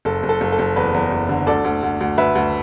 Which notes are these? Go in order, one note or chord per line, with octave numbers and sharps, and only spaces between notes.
F#1 A4
F#1
A4
F#1
A4
F#1
E2 B4
E2
F#1
D3
D2 A4 D5
D2
D2
D2
D2 B4 E5
D2